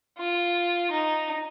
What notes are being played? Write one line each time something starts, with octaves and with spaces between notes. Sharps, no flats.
F4
D#4